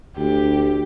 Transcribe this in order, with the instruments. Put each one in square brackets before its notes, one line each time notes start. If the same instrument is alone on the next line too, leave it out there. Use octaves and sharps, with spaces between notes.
[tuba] D2 [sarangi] G4